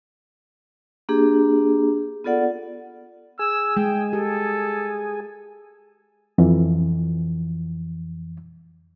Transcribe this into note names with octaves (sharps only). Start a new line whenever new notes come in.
A#3 D4 G4 G#4
B3 F4 A4 D5 F#5
G#4 E6
G#3 G5
G4 A4
F2 E3